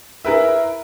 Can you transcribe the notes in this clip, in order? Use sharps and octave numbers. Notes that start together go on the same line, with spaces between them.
E4 G#4 A#4 B4 E5